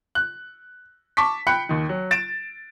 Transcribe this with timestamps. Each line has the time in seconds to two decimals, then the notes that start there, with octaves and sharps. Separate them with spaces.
0.15 F#6
1.17 A5 C#6 D6 B6
1.47 G5 B5 F#6 C#7
1.69 D#2 D#3
1.89 F#3
2.11 A6 D7 E7